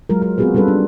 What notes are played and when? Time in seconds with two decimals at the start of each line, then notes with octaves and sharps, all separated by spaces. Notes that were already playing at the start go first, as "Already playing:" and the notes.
0.10 F#3 G#3 F4 A#4
0.22 A#4
0.38 B3 C4 F4 F#4 G#4 B4
0.54 G3 C#4 F4 A4 B4
0.68 D4